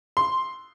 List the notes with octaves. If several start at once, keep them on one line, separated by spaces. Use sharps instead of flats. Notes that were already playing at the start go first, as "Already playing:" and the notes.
C6